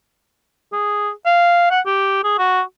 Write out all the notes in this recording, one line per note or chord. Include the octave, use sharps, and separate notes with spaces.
G#4
F5
F#5
G4
G#4
F#4